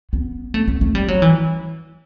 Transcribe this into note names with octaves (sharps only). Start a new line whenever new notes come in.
B3
A3
B3
A3
G3
F#3
E3